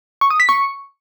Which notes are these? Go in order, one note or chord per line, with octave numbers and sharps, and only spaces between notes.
C#6
D#6
B6
C#6